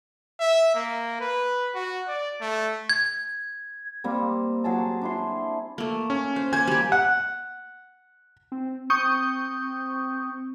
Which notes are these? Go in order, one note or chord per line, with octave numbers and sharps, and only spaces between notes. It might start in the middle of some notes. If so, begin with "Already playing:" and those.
E5
A#3
B4
F#4
D5
A3
G#6
G3 A#3 C4
F#3 G#4 A5
D4 E4 C6
A3 A#3
C#4
C5
A#3 C5 G#5 G6 G#6
G3 G4
F#5
C4
C4 C#6 D#6 G6